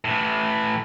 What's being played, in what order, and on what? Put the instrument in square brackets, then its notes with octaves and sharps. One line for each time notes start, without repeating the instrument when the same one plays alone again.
[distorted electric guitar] A2 E3